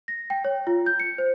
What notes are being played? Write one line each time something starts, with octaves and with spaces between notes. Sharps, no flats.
A#6
G5
C#5
F4
G6
C#7
C5